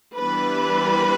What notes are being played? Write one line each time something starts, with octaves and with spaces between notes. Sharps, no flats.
E3 G3 B3 D4 B4